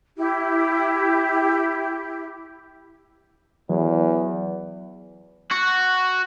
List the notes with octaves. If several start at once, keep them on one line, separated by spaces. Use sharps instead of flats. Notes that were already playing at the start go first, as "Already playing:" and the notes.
E4 G4
E2 E3 F#3
F#4